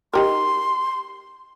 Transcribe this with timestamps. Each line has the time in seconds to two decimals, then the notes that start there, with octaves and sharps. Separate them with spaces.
0.14 D#4 G4 A#4 C6